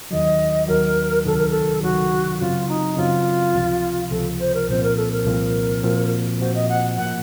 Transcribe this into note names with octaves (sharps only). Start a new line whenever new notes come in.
D#2 D#3 F#3 D#5
D#2 D#3 F#3 A#4
C#2 C3 D#3 F#3 A4
A#4
A4
C#2 C3 D#3 F#3 F#4
F#2 C#3 F#3 C4 F4
D#4
F#2 C#3 F#3 C4 F4
C#2 C3 F3
C#2 C3 F3 A4
C5
A#4
C2 A#2 F3 C4 C5
A#4
A4
A#4
C2 A#2 F3 C4
A#2 F3 C4 F#4
A#2 F3 C4 F#4 C5
D#5
F#5
A2 F3 A#3 F#5